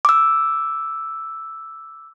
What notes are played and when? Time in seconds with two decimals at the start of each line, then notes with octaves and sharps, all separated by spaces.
0.05 D6 E6